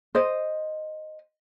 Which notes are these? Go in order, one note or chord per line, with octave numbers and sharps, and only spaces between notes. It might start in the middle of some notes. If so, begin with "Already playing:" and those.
C5 D#5